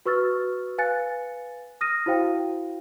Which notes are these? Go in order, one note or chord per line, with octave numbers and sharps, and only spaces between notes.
F#4 B4 C#6 E6 F6 A6
B4 F5 G#5 F#6 A6 C#7
D#6 F6 A#6 D#7
E4 F#4 C5 F5 G5